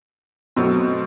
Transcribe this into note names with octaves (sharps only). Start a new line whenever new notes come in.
B2 F#3 A3 C4